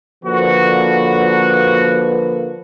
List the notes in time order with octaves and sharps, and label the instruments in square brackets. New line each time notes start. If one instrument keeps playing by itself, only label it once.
[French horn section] D3 F3 A#3 [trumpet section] F#4 [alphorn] B4